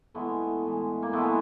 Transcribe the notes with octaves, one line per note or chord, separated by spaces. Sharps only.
A2 E3 G#3 A3 B3
A2 E3 G#3
A#3
A2 E3 G#3 A3 B3